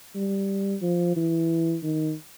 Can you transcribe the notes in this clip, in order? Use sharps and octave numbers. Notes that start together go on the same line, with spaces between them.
G3
F3
E3
D#3